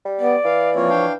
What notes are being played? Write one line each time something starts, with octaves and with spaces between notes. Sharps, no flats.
G3
B3 D5
E3 F5
F3 A#3 C4 F4 C#5
D4 F5 G5